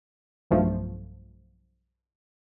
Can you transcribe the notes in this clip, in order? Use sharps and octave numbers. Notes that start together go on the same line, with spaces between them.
B1 G2 F3 A3